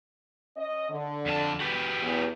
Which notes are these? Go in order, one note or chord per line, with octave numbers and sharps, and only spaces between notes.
C#4 D#5
D3
F2 F4 A5
F#4 G4 B4
E2